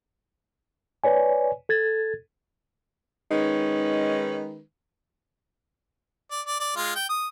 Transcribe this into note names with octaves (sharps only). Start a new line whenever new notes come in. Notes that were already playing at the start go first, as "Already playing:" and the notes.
B4 C#5 D5 G#5
A4 G#6 A6
D#3 G#3 C#4 D#4 B4
D5
D5
D5
G#3 F4
G5
D#6